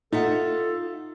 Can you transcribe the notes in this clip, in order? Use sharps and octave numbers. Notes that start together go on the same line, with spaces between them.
D#4 F4 A4 E5 F#5